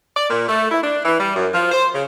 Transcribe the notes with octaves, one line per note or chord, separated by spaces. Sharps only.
D5
A#2
A3
E4
D4
E3
G3
F#2
F3
C5
C#3